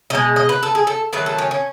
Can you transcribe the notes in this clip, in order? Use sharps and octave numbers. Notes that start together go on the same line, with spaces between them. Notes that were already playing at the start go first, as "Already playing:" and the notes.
B2 G#3 D#5
D#5
B4
A4
G#4
A4
D#3 F#3 A3 B4
A4
C#4
C#4